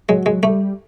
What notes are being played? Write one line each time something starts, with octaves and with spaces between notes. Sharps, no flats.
F#3 G#3
G#3
G3 A3